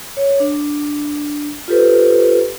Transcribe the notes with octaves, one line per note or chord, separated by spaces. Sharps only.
C#5
D4
F4 G4 A4 B4 C5